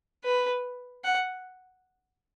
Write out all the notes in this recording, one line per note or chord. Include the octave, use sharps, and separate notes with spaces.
B4
F#5